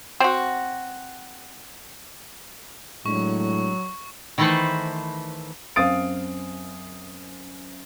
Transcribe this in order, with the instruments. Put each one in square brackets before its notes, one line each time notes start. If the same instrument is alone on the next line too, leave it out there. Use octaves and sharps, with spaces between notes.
[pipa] C4 F#4
[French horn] A2 [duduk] F#3 [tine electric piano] G#3 D4 [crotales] C#6
[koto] D#3 E3 A3 A4 B4 C5
[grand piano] F#2 C4 F5 D#6 A6 D7